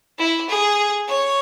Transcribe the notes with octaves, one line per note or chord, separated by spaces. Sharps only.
E4
G#4
C#5